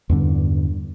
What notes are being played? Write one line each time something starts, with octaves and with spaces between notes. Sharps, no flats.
E2 G2 D3